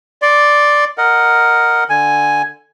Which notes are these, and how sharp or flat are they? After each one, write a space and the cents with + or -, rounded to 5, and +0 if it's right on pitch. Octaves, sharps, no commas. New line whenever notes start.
D5 +0 C6 +15
A#4 +0 D#5 +0 F#5 +0
D3 +10 G#5 +0